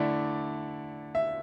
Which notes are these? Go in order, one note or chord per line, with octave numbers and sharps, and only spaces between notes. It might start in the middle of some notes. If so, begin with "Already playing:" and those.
Already playing: D3 A3 E4 D5
E5